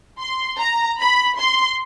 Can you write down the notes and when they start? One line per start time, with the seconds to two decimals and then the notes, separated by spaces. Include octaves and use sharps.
0.20 C6
0.59 A#5
0.99 B5
1.38 C6